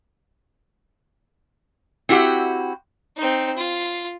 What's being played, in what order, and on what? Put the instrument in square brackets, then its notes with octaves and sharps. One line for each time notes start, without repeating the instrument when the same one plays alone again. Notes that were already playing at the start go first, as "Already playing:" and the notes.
[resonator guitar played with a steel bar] C4 E4 F#4 G4 F#5
[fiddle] C4 D#4
F4